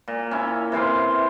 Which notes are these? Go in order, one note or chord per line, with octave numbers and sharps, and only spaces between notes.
A#2
C#4 E4
C3 E3 F5 C6